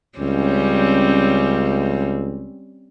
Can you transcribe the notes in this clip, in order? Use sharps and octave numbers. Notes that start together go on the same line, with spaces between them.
C#2 G3 C4 C#4